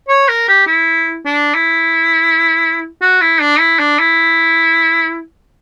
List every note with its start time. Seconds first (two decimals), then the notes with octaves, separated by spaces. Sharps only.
0.09 C#5
0.29 A#4
0.48 G4
0.67 E4
1.26 D4
1.55 E4
3.01 F#4
3.21 E4
3.41 D4
3.60 E4
3.79 D4
3.99 E4